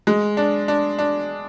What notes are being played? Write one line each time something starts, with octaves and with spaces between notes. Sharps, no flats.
G#3
D4
D4
D4